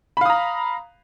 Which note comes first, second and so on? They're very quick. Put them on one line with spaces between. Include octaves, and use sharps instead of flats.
B5 F5 D#6 A#5